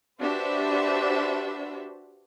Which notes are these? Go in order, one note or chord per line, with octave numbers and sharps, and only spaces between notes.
D4 F#4 G4 B4 C5 E5